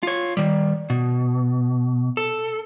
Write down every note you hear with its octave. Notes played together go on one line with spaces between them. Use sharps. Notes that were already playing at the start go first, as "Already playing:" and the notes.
F4 C#5
D#3 G3
B2
A4